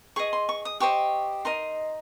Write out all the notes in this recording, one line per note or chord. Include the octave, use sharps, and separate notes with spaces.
G#4 D#5 C#6
C6
C#6
D#6
G4 C5 D#5 C#6
D#4 A#4 D#5 C6